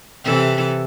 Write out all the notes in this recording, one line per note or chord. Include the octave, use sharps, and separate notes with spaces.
C3 E3 A4